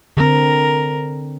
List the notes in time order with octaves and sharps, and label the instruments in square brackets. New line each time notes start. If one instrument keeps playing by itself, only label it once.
[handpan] D3 C4 [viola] A#4